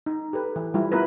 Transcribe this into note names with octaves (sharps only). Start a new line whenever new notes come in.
D#4
G4 A4 B4
E3
G3 E4 F4
B3 E4 F4 A#4 B4